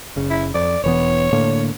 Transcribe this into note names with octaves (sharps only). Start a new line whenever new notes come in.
F#1 C#3
E4
F2 D5
E1 E3 B3 C#5
A2 D3 A#3